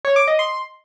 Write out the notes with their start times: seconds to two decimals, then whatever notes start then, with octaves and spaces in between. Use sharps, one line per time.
0.05 C#5
0.16 D6
0.28 D#5
0.39 C6